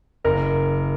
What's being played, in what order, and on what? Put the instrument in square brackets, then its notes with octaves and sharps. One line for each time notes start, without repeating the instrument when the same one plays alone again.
[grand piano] F#1 A#4